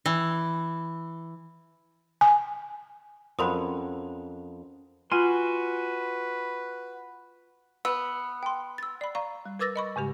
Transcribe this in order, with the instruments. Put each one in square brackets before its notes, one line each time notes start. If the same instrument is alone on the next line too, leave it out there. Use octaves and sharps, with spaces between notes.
[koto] E3
[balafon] G#5
[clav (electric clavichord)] F2 [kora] F#3 C#4 [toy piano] A#4 C5 [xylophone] B5 C6 D#6
[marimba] F4 [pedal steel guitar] F#4 G#5 C6 [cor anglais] B4
[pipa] B3 [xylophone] E6
[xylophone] G5 C6
E6 A6
[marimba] D5 B5
D5 F5 A#5 C#6
G3
A#4 B4 D6 E6 A6 A#6
D#5 B5 C#6
G#2 C#3 G#3 G4